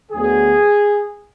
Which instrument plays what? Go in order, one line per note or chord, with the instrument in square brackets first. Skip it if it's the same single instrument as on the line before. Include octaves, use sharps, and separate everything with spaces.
[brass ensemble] D2 D3 F#3 B3 G#4